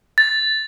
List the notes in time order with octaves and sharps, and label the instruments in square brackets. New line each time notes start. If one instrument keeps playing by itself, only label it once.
[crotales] A6